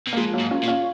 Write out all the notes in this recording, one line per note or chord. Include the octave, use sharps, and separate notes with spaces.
B2
A#3
A#2 F3 G#3
F#3 A#3
G#2
C#4 F4
A#2
C#4 F4